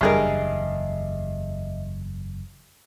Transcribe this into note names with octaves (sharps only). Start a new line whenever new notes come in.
F#1 E2 G2 G#4 A#4 D#5 E5